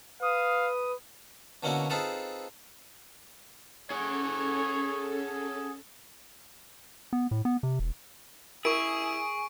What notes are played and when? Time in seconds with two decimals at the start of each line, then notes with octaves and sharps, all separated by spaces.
0.22 B4 F5 D#6
1.63 B2 D3 A#3 C#4 E4 F#4
1.90 C4 D#4 F4 G#4 A4 B4
3.91 C#4 G#4 A4 C#5 F#5
7.13 B3
7.31 A2
7.45 B3
7.63 C3
7.79 E1
8.65 E4 G#4 A#4 C#6 D7